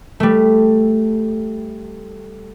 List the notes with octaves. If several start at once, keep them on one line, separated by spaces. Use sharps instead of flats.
G3 A3